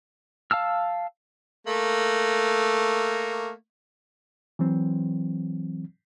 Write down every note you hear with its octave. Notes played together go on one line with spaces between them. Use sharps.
F5 A5 E6 F6
A3 A#3
E3 F#3 C4